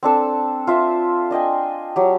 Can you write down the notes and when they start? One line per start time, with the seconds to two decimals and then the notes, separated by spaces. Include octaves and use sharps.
0.03 C4 D4 A4 E6
0.67 F4 C5 E5
1.31 D4 D#5 G5 G#5
1.96 F#3 G4